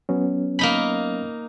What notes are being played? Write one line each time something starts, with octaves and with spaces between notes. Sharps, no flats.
F#3 B3 C#4
A#3 D#4 B5